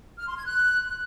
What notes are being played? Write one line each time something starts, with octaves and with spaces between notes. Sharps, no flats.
F6
C6
G#6
F#6